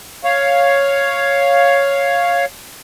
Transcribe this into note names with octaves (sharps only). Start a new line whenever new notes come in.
C#5 F5